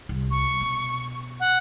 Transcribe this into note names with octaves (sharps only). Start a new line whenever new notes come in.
C2
C#6
B2
F#5